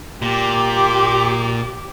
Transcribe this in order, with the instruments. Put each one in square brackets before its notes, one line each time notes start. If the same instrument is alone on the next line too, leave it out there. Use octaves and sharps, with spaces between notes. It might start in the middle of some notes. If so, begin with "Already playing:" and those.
[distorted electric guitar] A#2 [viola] G4 D6